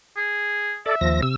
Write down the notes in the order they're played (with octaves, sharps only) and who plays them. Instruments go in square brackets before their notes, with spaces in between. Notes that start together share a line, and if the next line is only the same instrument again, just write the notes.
[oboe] G#4
[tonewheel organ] A4 D5 [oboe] E5
[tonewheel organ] D#2 F3 A#6
C3 E6